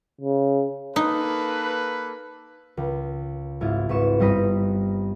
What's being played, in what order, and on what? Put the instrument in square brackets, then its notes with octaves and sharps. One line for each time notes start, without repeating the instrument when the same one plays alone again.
[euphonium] C#3
[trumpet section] A#3 A4 B4 [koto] D#4
[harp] C#2
G#1 E4 F4
G#1 B4 C#6 E7
G1 G3 C4 D#5 A#5 B6